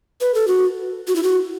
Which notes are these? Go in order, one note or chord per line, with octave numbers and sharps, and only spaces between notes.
B4
A4
F#4
F#4
E4
F#4